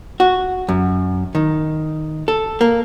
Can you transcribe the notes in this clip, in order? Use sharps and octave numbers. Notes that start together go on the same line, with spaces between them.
F#4
F#2
D#3
A4
A#3